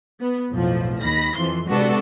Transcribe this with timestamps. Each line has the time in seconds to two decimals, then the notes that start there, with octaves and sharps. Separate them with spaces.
0.21 B3
0.51 B1 F2 A2 F3
1.01 D#2 D#3 B5 A#6
1.36 F2 E3 F3 C6
1.69 C3 G#3 B3 D4 F#4 A4